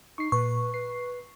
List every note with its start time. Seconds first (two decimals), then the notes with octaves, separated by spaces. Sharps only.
0.18 D#4 C#6 C7
0.32 A#2 B4 C#6
0.74 B4 C7